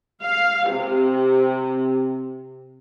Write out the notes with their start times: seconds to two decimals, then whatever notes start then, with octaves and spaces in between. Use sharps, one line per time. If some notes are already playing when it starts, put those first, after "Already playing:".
0.24 F5
0.71 C3